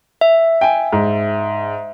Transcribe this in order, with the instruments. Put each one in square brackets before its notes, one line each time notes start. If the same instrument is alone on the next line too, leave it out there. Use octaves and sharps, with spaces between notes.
[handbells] E5
[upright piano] G5 G#5
G#2